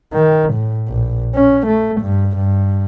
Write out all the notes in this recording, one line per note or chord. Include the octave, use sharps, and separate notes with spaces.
D#3
A2
A#1
C#4
A3
G2
G2